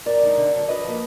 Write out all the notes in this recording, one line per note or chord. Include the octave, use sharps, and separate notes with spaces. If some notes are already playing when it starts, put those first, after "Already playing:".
F#2 A#4 D5
D3 G#3 D#4
D3
F#3 D4
D3 B4 D#5
F3 A#3